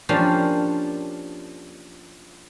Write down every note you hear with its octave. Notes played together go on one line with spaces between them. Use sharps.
F3 A#3 C#4 D4 F4 G4